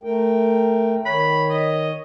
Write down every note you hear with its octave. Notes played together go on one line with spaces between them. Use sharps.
A3 A#4 G5
D#3 C#5 B5
D#5